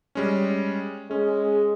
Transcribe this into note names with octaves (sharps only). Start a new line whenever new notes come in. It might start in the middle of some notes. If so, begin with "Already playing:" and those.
G3 G#3 C#4
G#3 C#4